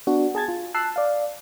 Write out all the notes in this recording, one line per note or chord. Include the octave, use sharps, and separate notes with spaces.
B3 D4 F#4
G#4 A5 G#6 A6
F4
A5 E6 F#6 C7
D5 F5